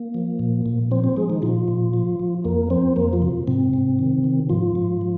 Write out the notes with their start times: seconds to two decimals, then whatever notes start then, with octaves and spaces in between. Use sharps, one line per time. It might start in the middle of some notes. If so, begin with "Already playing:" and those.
Already playing: A#3
0.14 F3
0.39 A#2
0.66 A#2
0.91 F3 C4 C5
1.04 C4 C5
1.16 F3 G#3 G#4
1.30 D#3 D#4
1.42 A#2 F3 F4
1.68 A#2
1.93 F3
2.20 F3
2.44 F2 A#3 A#4
2.70 F3 C4 C5
2.96 F2 A#3 A#4
3.13 F3 F4
3.22 C3
3.47 G#2 C3 C4
3.73 G#2
3.99 D#3
4.24 D#3
4.49 G#2 F3 F4
4.75 G#2
5.01 F3